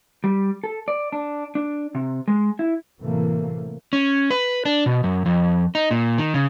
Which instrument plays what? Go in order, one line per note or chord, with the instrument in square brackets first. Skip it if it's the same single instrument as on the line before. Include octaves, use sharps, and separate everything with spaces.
[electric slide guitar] G3
A4
D5
D4
D4
C3
G#3
E4
[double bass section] A2 C3 E3 F#3 A3 A#3
[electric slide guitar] C#4
B4
D4
B2
F#2
F2
D#4
A#2
D#3
C#3